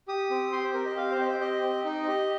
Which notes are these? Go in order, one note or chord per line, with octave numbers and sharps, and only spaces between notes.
G4 D#6
C4
G4 C6
C5
C4 A#4
D#5
G4 F5
C5
C4 D#5
C5
G4 D#5
C4
D#4
G4